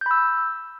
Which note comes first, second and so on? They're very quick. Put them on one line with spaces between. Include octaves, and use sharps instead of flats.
G6 B5 E6